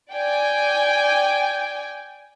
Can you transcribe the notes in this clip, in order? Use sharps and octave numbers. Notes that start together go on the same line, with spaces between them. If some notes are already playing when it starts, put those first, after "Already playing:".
D5 G5 G#5